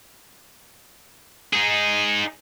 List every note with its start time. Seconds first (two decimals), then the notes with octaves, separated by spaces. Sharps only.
1.53 D#4 G#4